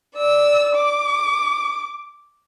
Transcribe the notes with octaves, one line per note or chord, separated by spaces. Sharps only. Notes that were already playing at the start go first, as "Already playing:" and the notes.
D5 E6
D6